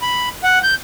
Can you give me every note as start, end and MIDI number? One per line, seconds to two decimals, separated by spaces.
0.02 0.29 83
0.44 0.59 78
0.63 0.74 91